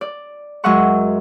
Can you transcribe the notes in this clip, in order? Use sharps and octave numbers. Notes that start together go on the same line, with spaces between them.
D5
F#2 G#3 D#5 E5 F#5 C#6